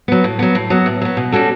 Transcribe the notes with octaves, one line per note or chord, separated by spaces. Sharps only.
F#3 B3
A2
F#3 B3
A2
F#3 B3
A2
F#3 B3
B2
G3 C#4 F#4 A4